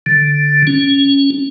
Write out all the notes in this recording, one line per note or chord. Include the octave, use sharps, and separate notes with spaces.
D3
C#4